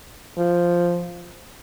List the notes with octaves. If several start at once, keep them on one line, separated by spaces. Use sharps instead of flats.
F3